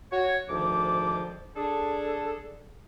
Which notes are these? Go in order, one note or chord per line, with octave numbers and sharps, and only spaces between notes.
F#4 C#5
D2 G#2 D#3 F3 D6
D4 G#4 A4